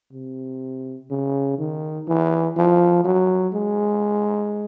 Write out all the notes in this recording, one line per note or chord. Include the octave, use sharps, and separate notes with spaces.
C3
C#3
D#3
E3
F3
F#3
G#3